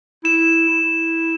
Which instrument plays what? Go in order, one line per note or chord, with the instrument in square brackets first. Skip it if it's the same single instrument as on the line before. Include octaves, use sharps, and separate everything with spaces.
[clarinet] E4 [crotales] E7
[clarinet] E4